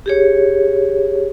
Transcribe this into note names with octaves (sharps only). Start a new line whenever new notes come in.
G4 G#4 C#5